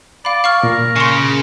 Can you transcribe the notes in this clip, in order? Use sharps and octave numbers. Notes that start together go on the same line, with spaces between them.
D5 F5 B5
F5 C#6 F6
A#2 A#4
C#3 C6 C#6